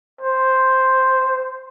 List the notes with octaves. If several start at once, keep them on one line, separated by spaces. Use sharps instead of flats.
C5